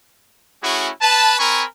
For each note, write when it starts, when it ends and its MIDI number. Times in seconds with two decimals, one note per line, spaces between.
0.63 0.90 57
0.63 0.90 61
0.63 0.90 64
0.63 0.90 66
0.63 0.90 68
1.01 1.37 71
1.01 1.37 81
1.39 1.64 60
1.39 1.64 70
1.39 1.64 80
1.39 1.64 83
1.39 1.64 85